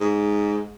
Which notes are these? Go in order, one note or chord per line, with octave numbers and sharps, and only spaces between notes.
G#2